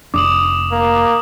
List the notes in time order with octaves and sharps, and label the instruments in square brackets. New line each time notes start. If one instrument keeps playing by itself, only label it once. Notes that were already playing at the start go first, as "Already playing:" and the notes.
[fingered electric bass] F1 D4 [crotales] D6 D#6 F#7
[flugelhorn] A#3